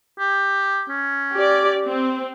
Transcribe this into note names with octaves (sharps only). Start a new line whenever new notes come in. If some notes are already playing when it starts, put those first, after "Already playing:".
G4
C#4
G4 D5
C4